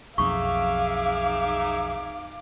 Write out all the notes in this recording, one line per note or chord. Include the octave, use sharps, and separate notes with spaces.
B1 F2 D#4 G#4 E5 F5 C#6 D6